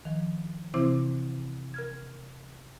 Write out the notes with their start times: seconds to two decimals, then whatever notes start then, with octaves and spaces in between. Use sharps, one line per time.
0.05 D#3 F3
0.74 C3 E3 C4 E4 C5 D6
1.74 A#4 F6 G#6